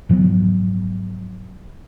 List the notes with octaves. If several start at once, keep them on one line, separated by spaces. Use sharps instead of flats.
G#2 F3 F#3 B3